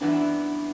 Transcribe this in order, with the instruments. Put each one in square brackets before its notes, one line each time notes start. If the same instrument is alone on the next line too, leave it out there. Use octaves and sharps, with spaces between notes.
[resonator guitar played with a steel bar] F#2 E3 G3 B3 E4 [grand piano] D4